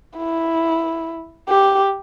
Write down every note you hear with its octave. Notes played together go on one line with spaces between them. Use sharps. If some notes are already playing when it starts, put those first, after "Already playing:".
E4
G4